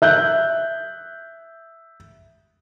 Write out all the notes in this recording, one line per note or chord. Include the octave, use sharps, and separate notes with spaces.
E5 F#6 G6